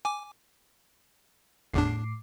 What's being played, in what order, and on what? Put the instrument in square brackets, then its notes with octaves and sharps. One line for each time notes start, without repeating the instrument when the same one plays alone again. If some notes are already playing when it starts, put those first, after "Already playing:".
[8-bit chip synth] G#5 D6
[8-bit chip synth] G1 E2 D4 [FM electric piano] A2 D6 C7